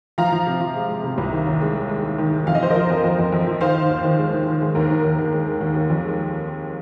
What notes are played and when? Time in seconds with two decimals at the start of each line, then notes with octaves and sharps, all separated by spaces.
0.18 F3 F5 A#5
0.32 F3
0.47 C3
0.60 F3
0.75 G#3
0.89 G#3
1.04 C3
1.18 C2
1.32 D#3
1.46 D#2
1.61 G#3
1.76 G#3
1.89 G#3
2.04 G#3
2.18 D#3
2.32 G#3
2.46 F2 F5
2.55 D#5
2.61 F3 C5
2.70 A#4 D#5
2.75 F3
2.90 F2
3.04 F2
3.19 F2
3.32 F2
3.47 F3
3.61 D#3 C5 F5
3.75 D#3
3.89 D#2
4.04 D#3
4.18 G#3
4.33 D#3
4.47 D#3
4.61 G#3
4.75 D#2 A#4
4.90 D#3
5.04 D#2
5.18 D#2
5.33 G#3
5.47 G#3
5.61 D#2
5.75 D#2
5.90 F2
6.05 G#3